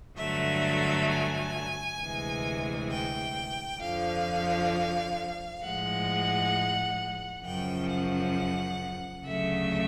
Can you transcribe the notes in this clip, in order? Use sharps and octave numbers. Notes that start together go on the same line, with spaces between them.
G2 D3 F#3 A3 E5
G#5
D2 C3 E3 G#3
G5
F2 D3 F3 F5
A2 F3 G#3 F#5
F#2 C#3 F3 G5
F#5
D2 C#3 F#3 A3 E5